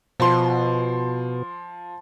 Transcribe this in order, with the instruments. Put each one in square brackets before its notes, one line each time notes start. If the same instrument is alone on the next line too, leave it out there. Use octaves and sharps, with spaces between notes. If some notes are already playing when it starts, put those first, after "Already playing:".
[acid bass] B2 [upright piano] F3 C6